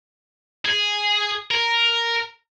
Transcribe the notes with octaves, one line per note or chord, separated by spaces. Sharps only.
G#4
A#4